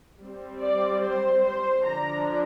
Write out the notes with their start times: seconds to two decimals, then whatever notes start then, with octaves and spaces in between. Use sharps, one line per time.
0.20 G3 C4
0.61 D5
1.03 C5
1.44 C5
1.86 D3 F3 D4 A#5